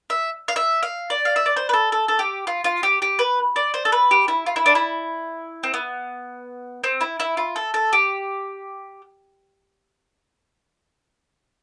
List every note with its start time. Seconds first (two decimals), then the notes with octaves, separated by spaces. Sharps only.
0.10 E5
0.48 F5
0.56 E5
0.83 F5
1.10 D5
1.25 F5
1.36 E5
1.46 D5
1.56 C5
1.69 B4
1.73 A4
1.92 A4
2.08 A4
2.19 G4
2.47 F4
2.64 F4
2.83 G4
3.02 G4
3.19 B4
3.56 D5
3.74 C5
3.85 A4
3.92 B4
4.11 G4
4.28 E4
4.46 F4
4.56 E4
4.66 D4
4.75 E4
5.63 C4
5.74 B3
6.84 C4
7.01 E4
7.20 E4
7.37 F4
7.56 A4
7.74 A4
7.93 G4